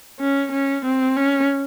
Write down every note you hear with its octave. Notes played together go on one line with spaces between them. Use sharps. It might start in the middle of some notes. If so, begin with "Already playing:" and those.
C#4
C#4
C4
C#4